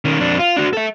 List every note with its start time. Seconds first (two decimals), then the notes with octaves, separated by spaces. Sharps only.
0.05 D#3 C#4
0.20 F2 D4
0.39 F4
0.56 D4 F#4
0.73 A4 E5